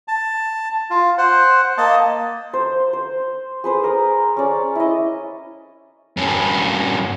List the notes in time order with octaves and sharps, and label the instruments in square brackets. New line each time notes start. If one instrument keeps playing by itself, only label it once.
[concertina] A5
F4
C5 F#5
A#3 D#5 A5
[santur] C5
C5
G#4 B4 C5
A#4 D#6
C#4 D5
E4 D#5
[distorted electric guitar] G2 C#4